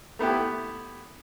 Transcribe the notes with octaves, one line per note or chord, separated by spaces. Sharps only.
A3 B3 E4 G4